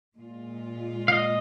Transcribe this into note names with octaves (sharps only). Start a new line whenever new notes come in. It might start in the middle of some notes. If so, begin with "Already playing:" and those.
A#2 G#3 F4
F5
D#5